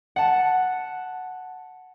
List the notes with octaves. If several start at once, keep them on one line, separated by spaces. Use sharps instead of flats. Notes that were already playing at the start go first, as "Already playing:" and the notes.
F#5 A5